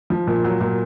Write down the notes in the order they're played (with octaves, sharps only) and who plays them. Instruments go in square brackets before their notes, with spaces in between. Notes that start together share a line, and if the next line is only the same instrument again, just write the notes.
[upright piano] F3
A#2
F#3
A#2